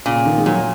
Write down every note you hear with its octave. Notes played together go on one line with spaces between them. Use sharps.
A#2 C#3
D#3
G#3
A#2 F#3